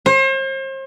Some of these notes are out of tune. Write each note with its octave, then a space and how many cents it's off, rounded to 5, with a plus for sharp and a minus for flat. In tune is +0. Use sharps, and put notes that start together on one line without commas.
C5 +40